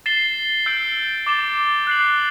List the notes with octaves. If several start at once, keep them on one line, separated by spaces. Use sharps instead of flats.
A6 C7 E7 G7
E6 G6 D7
D6 A6 E7 G7
F#6 C7 F#7